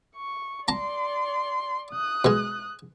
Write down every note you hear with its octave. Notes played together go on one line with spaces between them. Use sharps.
C#6
D5 A5 A#5 C6
D#6 F#6
B2 G#3